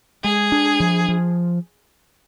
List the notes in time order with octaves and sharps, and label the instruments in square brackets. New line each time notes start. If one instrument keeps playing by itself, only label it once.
[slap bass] G#3 [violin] G#4
[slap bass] D4
F3
F3